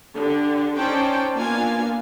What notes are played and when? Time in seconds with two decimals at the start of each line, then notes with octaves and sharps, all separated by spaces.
0.14 D3 G4
0.76 C#4 D#4 C5 D5 G5 A5
1.35 A#3 B3 D4 F4 F5 G#5